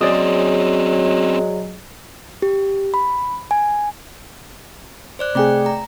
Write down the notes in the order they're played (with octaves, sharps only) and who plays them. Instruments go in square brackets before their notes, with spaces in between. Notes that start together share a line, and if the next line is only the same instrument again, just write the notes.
[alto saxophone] F#3 [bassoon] G#3 [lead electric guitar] C4 C#4 [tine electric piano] G#4 D5 D#6
[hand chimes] G4
B5
G#5
C5 D5 F#6
[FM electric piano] C3 G#4 [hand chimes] A3 D5 G5
[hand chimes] A#5